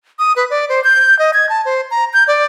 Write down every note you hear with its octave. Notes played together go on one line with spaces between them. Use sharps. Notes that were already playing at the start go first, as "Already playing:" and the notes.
D#6
B4
D5
C5
G6
D#5
G#6
A5
C5
A#5
G6
D5